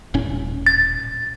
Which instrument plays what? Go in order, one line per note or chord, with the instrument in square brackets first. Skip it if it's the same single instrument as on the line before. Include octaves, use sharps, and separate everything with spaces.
[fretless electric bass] D#1 A2 C#4
[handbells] A6